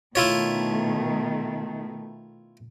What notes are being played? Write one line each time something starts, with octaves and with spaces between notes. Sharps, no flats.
B2 D#3 A3 E4 F4 C#5